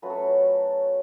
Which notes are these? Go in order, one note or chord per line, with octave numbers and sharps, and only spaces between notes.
F#3 A3 C#4 F4 B4
A4
B4